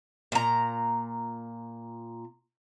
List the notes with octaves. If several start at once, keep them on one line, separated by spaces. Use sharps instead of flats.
A#2 A#5